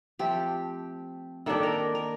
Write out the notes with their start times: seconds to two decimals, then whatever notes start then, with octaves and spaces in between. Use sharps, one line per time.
0.19 F3 A3 C4 G4
1.46 D#3 A#3 D4 G4 A4
1.63 A#4
1.95 A#4